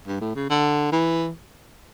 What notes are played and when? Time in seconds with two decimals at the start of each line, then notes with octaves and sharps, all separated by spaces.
0.07 G2
0.21 A2
0.35 C#3
0.50 D3
0.92 E3